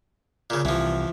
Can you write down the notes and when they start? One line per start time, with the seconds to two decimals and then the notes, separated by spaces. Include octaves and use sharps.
0.50 A#2 C#3
0.65 C2 E3 F3